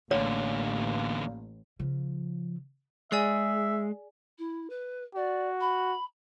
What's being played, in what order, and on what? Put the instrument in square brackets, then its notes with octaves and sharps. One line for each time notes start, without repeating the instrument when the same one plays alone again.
[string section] A1 [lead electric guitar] E2 D3 [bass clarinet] A#3 [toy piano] C#5
[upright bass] C#3 F3
[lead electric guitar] G#3 [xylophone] G#4 D5 G#5 [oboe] E5
[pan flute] E4
B4
[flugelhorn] F#4 [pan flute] D5
[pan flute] B5